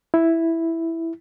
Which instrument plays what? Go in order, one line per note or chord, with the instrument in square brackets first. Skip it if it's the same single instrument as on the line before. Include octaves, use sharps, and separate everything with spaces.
[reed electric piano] E4